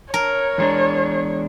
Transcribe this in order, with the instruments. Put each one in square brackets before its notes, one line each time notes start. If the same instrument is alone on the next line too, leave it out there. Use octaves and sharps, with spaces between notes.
[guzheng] A#4 [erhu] C#5
[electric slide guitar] E2 G#3 D4